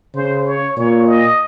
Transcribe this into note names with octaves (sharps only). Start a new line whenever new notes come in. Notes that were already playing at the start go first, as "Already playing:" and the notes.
C#3 C5
C#5
A#2 C#5
D#5